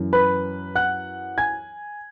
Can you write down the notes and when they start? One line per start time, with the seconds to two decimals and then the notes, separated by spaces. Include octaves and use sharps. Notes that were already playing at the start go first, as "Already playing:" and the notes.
Already playing: F#2 E3
0.13 B4 B5
0.75 F#5 F#6
1.38 G#5 G#6